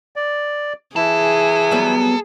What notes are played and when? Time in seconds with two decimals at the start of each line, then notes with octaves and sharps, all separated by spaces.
0.16 D5
0.96 E3 E4 G#4 A4
1.71 F#3 G3 B3